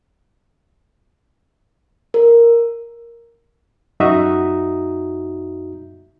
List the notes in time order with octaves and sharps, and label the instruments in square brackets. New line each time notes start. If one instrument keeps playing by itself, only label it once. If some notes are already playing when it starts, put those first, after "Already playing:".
[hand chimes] A#4
[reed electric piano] F#2 D#4 F#4 E5 A#5 D#6